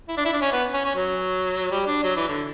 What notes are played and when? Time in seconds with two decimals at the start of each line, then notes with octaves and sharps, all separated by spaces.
0.08 E4
0.17 D4
0.25 E4
0.33 D4
0.41 C#4
0.52 B3
0.73 C#4
0.85 C#4
0.95 F#3
1.71 G3
1.87 D4
2.03 F#3
2.16 E3
2.29 D3